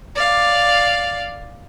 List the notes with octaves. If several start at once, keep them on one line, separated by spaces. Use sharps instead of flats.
D5 F5